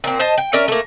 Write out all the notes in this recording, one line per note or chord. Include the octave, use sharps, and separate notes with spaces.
A#2 C4
C5 D#5 A5
G5
C#4 A#4 D5 E5
A3 A#3